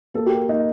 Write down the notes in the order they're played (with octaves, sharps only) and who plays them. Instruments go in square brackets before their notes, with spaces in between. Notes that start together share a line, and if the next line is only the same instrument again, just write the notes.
[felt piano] A#3 [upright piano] A4
[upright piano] G4
[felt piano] A#4
[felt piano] A#3 [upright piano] D#4